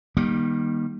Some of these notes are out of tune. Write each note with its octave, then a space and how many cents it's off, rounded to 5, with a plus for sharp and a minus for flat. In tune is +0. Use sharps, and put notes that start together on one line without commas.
D#3 -15 G3 +0 A#3 +35